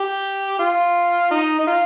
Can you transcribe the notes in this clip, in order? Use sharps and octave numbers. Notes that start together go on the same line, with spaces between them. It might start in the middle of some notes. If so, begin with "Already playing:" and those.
Already playing: G4
F4
D#4
D#4
F4